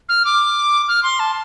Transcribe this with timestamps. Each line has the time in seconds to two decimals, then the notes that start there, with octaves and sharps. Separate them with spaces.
0.09 F6
0.25 D6
0.88 F6
1.03 C6
1.19 A5